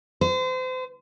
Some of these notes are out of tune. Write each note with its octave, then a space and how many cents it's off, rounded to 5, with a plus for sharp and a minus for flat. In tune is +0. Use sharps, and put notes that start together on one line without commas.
C5 -35